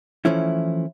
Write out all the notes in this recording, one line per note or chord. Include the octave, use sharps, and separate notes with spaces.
E3 F3 A3 C#4 E4